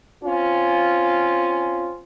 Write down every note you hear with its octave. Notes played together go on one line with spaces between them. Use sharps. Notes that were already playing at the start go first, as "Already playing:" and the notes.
C4 C#4 F4